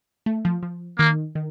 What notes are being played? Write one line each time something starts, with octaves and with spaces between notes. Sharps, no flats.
A3
F3
F3
D#3 A#3
D#3